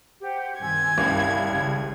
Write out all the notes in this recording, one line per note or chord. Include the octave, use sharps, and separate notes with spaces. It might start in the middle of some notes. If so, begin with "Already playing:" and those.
G4 C5 F#5
G2 C3 D#3 G#5 C6 E6 G#6
G1 C2 C#4 E5 F5 B5
G#1 C#3 C#4